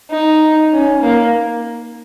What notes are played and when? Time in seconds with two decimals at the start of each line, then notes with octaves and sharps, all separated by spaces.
0.11 D#4
0.73 C#4
1.02 A#3